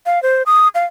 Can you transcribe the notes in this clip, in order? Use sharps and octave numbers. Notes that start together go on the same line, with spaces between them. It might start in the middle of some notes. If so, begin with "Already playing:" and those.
F5
C5
D#6
F5